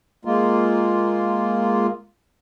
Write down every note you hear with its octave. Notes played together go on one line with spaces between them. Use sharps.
G#3 A#3 F4